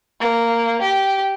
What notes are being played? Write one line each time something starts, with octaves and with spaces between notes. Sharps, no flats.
A#3
G4